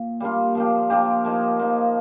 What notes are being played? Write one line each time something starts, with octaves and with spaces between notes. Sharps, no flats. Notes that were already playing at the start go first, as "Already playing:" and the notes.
Already playing: A#2
G3 A#3 D4 F4
F3 A#3 D4 G4
F3 A#3 D4 G4
F3 A#3 D#4
F3 A#3 D#4